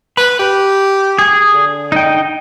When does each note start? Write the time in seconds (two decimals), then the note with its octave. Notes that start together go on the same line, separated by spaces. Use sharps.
0.17 B4 B5
0.39 G4
1.19 G#4
1.53 D3
1.92 D#4 G5